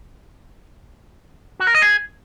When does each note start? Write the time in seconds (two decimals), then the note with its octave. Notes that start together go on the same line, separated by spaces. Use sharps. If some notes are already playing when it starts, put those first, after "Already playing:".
1.60 F#4
1.67 A#4
1.75 D#5
1.82 G#4